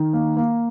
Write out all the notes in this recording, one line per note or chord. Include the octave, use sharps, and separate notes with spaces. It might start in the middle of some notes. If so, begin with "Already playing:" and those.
Already playing: D#3
A#3
A#3